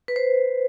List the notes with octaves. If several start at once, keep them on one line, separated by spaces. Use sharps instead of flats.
B4
C5